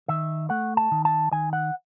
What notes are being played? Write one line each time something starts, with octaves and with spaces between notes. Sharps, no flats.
D#3 E5
A3 F#5
A5
D#3
A5
D#3 G#5
F#5